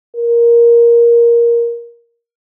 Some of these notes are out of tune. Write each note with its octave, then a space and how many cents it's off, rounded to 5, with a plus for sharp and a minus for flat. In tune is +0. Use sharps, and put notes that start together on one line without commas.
A#4 +10